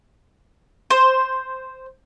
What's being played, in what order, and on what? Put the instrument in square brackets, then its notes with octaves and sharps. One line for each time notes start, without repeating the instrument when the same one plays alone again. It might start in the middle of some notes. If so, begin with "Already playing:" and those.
[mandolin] C5